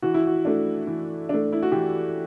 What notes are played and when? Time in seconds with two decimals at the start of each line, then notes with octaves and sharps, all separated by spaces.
0.02 E3 F#4
0.14 E4
0.27 F#4
0.45 A3 D4
0.87 E3
1.29 A3 D4
1.52 E4
1.63 F#4
1.72 E3 G4